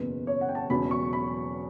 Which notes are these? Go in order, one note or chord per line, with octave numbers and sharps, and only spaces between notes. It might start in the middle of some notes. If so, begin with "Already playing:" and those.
Already playing: F#1 E2 B2 B4
C#5
F#5
G5
A5
E1 E2 C#3 F#3 B5
C#6
B5